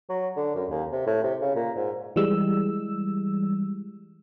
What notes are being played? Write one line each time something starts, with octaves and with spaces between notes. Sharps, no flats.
F#3
D3
F#2
D#2
C3
A2
C3
C#3
A#2
G#2
E3 G3 G#3 E6